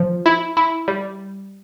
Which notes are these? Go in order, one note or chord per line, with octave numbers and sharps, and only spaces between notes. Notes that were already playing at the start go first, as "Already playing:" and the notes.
Already playing: F3
E4
E4
G3